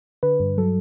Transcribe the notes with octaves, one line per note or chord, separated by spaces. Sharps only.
D3 B4
G2
F#3 A4